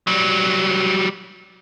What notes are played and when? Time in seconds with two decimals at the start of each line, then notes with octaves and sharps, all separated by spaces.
0.07 F#3 G3